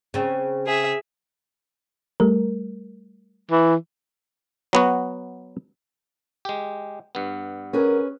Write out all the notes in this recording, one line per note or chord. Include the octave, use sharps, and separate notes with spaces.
C#3 C4
G#4 E5
G3 A3 A#4
E3
F#3 B3 F#4
G#3 G4
G2 B3
C#4 G#4 A#4 B4